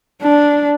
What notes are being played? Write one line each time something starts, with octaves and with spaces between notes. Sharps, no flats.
D4